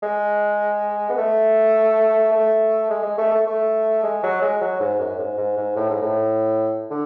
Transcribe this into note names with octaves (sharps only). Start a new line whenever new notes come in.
G#3
B3
A3
A3
G#3
G#3
A3
A3
A3
G#3
F#3
G#3
F#3
G#2
F#2
G#2
G#2
G#2
A2
G#2
A2
D3